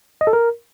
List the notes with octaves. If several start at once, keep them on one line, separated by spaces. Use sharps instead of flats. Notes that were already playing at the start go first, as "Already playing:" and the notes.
D#5
A4
A#4